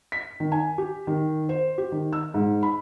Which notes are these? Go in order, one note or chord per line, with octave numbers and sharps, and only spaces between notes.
B6
D#3
G#5
G4
D#3
C5
G4
D#3
E6
G#2
B5